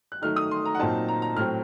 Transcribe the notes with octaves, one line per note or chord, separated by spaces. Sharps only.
F#6
D#3 F#3 A3 D#4 F6
D#6
C6
A#5
F#5
A#2 F#3 C4 D#4 A5
A#5
A#5
A2 F#3 C4 F6